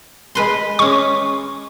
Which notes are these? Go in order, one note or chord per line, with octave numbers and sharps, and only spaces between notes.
G#3 B4 C6
G#3 C#4 C#6